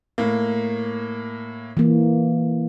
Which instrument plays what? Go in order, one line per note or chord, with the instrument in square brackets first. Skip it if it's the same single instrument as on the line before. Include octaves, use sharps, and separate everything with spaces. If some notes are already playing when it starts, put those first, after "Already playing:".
[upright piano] A2 A#3
[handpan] E3 A#3